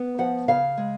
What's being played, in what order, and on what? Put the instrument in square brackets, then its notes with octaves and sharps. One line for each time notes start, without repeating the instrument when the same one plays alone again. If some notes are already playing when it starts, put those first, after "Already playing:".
Already playing: [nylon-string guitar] B3
F3 F#5
C#3 F5
G#3